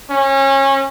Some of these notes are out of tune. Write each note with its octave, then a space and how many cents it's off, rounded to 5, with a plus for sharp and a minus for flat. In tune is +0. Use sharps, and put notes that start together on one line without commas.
C#4 -25